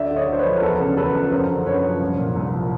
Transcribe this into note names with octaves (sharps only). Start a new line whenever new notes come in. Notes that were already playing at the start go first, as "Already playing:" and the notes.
Already playing: D2 D5 E5
D3
C#5 D#5
D2 C5
B4 C#5
F3
A#4
E2 A4 B4
C#3
E2 A4 B4
F3
F#2 A#4 C5
D3
F#2 B4 C#5
F3
C2
A#2
C2
F3